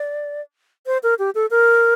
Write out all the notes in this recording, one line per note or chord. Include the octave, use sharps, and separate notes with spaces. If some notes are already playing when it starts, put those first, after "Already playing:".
Already playing: D5
C5
A#4
G4
A4
A#4